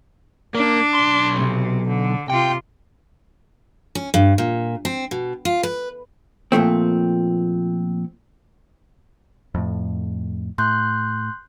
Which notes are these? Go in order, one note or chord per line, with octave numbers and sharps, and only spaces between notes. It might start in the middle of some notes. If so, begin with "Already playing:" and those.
A#3 D4
B1 C6
C3
D3
C3 F4 G5
C#4
G2
A#2
C4
B2
F4
B4
A#2 F3 A3 C4
F2 A2
A2 C6 F#6 G6